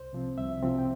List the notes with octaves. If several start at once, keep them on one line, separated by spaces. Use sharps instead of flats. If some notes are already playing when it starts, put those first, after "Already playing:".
Already playing: C2 C5
C3 F3 C4
C2 E5
C3 F3 C4
G5